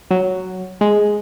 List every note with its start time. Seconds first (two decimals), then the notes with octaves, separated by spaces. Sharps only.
0.11 F#3
0.81 G#3